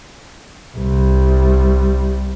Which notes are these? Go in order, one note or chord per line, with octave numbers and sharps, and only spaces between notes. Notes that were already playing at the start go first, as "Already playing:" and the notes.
C2 G3